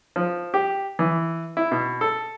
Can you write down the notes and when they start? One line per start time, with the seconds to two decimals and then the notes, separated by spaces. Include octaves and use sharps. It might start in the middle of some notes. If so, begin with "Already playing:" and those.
0.16 F3
0.54 G4
0.99 E3
1.57 E4
1.71 B2
2.01 A4